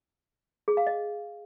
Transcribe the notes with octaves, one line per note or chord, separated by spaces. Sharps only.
G#4
F5
D#5